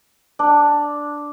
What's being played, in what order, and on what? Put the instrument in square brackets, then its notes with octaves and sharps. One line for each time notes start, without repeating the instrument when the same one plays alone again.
[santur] D4